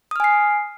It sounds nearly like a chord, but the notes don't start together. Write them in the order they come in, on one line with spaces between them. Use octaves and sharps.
D#6 F6 G#5 C7